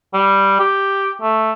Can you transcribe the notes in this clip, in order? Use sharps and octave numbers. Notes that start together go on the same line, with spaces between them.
G3
G4
A3